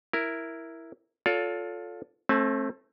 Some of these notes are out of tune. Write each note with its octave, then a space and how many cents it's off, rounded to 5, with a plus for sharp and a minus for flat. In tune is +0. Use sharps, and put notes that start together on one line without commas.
E4 +0 A#4 +0
F4 +20 A4 +0 C#5 +45
A3 +0 C4 +35 A5 -40